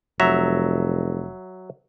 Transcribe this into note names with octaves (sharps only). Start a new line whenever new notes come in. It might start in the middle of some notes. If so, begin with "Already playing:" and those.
F1 F#3 E5 A#5